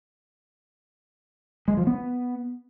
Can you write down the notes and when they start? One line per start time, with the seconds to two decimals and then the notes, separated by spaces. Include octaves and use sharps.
1.68 G#3
1.77 F3
1.87 B3